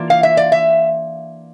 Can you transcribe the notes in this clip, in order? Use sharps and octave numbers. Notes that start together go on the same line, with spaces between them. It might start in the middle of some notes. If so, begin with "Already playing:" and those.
Already playing: E3 A#3 D4 F4
F5
E5
D5
E5